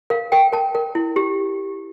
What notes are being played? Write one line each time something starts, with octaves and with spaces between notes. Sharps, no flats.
A#4 F5
A#4 G5
A#4 A5
A#4
E4
G4